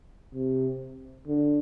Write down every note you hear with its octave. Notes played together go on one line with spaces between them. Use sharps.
C3
D3